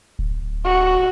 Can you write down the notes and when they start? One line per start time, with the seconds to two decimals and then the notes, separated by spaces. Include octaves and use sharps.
0.19 D1
0.65 F#4